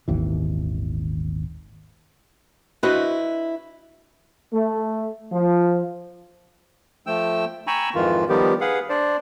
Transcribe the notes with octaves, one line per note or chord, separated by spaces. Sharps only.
D#1 G#1 D#2 E3
D4 E4 F#4 B4 C5 D#5
A3
F3
F3 A3 G5 E6
G5 G#5 A#5 B5 C#6 E6
F2 G#2 D#3 E3 F4
D#3 F3 G3 B3 G4
G#4 B4 F5 F#5
D4 C5 D5